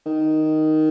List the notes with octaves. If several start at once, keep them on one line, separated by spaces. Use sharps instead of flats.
D#3